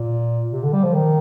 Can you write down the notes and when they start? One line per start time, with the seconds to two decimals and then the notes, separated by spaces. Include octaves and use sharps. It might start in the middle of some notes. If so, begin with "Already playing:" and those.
Already playing: A#2
0.52 C3
0.63 D3
0.73 G3
0.83 F3
0.94 D#3